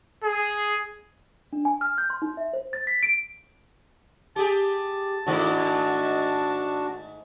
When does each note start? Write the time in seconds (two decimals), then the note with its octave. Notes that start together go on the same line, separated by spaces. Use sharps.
0.23 G#4
1.53 D4
1.65 G#5
1.81 F6
1.98 G6
2.10 C6
2.22 D#4
2.37 E5
2.53 C5
2.73 A6
2.87 B6
3.03 D7
4.36 G4 G#4 A5
5.27 G#2 D#3 A3 D4 F#4